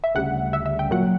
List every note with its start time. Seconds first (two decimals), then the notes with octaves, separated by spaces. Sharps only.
0.04 E5
0.15 D2 C#3 G3 F#5
0.53 E5
0.66 E5
0.79 G5
0.91 A#2 F#3 F#5